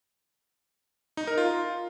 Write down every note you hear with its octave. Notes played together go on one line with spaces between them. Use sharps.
D#4
A#4
F4